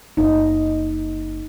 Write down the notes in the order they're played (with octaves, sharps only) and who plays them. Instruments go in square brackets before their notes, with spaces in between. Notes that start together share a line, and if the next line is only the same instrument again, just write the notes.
[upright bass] F#1 [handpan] D#4